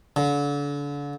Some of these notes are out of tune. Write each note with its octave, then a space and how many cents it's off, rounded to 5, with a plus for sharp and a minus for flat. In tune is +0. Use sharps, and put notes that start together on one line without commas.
D3 -35